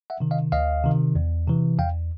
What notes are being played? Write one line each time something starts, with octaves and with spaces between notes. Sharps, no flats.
E5 F#5
C3 D#3
D#5 F5
D2 D#5 F5
C3 D#3
E2
C3 E3
E2 F5 G5